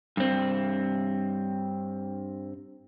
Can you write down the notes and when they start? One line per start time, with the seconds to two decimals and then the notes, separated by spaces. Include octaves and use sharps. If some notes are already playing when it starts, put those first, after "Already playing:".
0.17 G2 C4